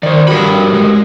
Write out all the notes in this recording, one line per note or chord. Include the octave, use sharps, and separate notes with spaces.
D#3 C5 D5
G2 F#4 G4 A#4 B5
G#3